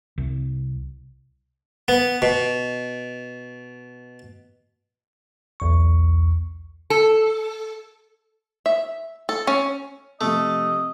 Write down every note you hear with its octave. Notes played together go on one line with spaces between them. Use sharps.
C2
B3
B2
B1 E2 C#6
A4
E5
A4
C#4
C3 F3 A3 D#5